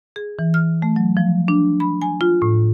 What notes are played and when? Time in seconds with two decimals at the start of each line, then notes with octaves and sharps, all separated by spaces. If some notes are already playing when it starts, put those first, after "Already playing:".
0.16 G#4
0.39 E3
0.54 F6
0.82 A3
0.96 F#3
1.17 F3
1.48 D4
1.80 B5
2.02 G#5
2.21 F4
2.42 A2